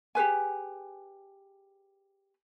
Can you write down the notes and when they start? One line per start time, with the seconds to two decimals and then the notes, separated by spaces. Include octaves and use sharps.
0.15 G4 G#4 B4 G#5